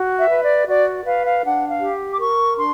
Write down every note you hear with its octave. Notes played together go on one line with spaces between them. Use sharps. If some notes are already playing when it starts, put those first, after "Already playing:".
Already playing: F#4
E5
B4
D5
F#4 D5
B4 F5
F5
D4 F#5
F5
G4
D6
A#4 C#6
D4 C6